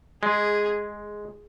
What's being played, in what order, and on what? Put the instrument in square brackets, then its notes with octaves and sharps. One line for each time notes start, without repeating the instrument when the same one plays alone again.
[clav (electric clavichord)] G#3 [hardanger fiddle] G#4